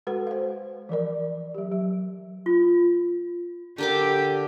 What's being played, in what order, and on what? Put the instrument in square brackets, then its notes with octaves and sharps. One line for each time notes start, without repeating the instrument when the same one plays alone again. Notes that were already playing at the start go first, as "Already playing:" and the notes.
[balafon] G#3 F#4 A4 B4 F#5
C5 F5
E3 F3 A#4 D5
F#3 G4
F#3
[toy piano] F4
[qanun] D3 A#4 D6 [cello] G4